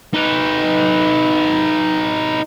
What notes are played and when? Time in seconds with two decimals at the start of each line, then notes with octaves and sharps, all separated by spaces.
0.14 D#4 B4